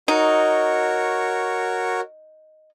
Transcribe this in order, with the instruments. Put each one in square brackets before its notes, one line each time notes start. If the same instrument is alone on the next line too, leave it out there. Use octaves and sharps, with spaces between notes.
[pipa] D#4 [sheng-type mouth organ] F#4 A#4 C#5